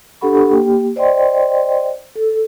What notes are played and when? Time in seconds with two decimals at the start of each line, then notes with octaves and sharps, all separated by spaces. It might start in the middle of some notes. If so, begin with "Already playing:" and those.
0.21 D4 G4 A4 F#5 B5 C#6
0.50 A#3 G4 G5
0.96 C5 D5 D#5 G5 C6
2.16 A4